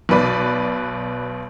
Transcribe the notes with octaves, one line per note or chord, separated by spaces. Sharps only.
B1 B2 B4 D5 B5